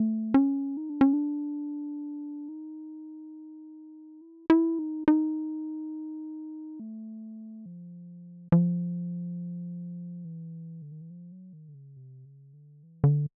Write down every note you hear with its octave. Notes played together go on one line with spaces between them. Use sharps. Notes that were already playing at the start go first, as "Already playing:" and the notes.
Already playing: A3
C#4
D#4
D4
C#4
D4
D#4
E4
E4
D#4
D#4
A3
F3
F3
E3
D3
D#3
E3
F3
F#3
D#3
D3
C#3
C3
C#3
D3
E3
D3